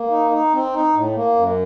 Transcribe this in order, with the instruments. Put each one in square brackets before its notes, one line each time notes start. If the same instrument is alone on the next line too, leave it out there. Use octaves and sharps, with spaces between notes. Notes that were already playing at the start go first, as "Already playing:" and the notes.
Already playing: [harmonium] A#3
D#4
D#4
C4
D#4
A2
A#3
F#2